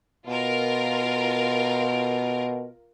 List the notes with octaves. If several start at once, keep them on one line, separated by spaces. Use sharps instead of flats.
B2 F4 A#4